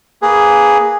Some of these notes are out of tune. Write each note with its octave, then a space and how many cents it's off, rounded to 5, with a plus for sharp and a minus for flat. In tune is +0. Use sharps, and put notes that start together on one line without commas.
A#3 +0 G#4 +0 B4 +0